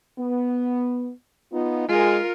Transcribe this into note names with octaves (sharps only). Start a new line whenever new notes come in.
B3
B3 D#4 F4
G#3 F4 A#4